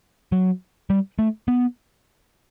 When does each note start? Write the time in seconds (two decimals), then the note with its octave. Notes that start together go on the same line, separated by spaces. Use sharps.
0.32 F#3
0.90 G3
1.19 A3
1.48 B3